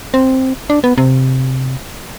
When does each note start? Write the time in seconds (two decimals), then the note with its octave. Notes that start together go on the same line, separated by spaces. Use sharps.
0.14 C4
0.70 D4
0.84 B3
0.98 C3